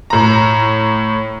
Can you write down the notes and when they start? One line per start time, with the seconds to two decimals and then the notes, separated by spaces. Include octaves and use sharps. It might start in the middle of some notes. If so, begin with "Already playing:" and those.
0.10 A2 A#5